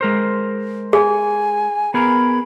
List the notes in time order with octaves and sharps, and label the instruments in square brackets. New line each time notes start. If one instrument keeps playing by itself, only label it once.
[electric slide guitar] G#3 A#4 C5
[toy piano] G#4 [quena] G#5
[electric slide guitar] B3 G#4 A#4 [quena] B5